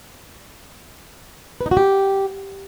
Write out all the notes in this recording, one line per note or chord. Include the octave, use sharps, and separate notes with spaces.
B4
D#4
F#4
G4